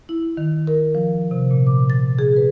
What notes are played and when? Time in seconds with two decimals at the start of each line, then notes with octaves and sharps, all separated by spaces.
0.09 E4
0.37 D#3
0.67 A#4
0.95 F3
1.31 C3
1.51 A#2
1.67 D6
1.90 A6
2.19 G#4
2.36 B4